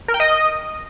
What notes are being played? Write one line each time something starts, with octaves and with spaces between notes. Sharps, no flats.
A#4
G5
D#5